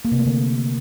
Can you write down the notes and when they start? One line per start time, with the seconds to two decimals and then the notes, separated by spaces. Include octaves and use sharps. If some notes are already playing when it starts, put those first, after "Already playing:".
0.05 A#3
0.12 C3
0.19 A3
0.26 D3